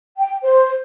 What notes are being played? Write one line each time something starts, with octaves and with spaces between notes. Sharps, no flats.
G5
C5